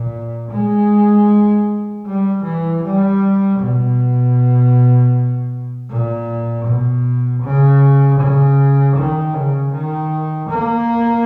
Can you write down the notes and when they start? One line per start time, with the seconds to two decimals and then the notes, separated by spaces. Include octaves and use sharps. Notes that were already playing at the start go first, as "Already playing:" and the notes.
Already playing: A#2
0.52 G#3
2.06 G3
2.44 E3
2.83 G3
3.59 B2
5.90 A#2
6.66 B2
7.43 C#3
8.19 C#3
8.97 D#3
9.34 C#3
9.73 D#3
10.50 A#3